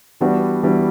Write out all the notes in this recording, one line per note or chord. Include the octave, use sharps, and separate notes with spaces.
E3 G3 B3 D4 F#4
E3 G3 B3 D4 F#4